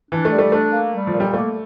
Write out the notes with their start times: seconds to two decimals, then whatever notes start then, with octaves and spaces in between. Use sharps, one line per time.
0.11 E3 D4
0.25 A3
0.32 G3
0.38 A3
0.52 A3 D4
0.72 A#3
0.93 G3
1.07 F3
1.13 A#2
1.20 G3
1.33 A3 A#3